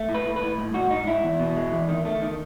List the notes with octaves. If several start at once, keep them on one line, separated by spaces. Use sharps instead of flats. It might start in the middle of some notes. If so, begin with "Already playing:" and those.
Already playing: A3
A2
B4
A2
B4
A2
G#2
G#2 F#4
G#2 D#4
G#2 E4
E2
B2
G#3
E2
D#3
A3
D#3